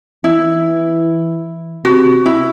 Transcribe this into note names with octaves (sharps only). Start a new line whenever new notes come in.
E3 E4
C3 F#4
E4